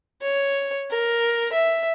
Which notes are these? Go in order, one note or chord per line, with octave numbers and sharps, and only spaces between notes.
C#5
A#4
E5